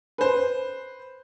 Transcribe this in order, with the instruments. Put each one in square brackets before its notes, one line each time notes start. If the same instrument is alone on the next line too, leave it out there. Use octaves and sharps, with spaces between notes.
[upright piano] B4 C5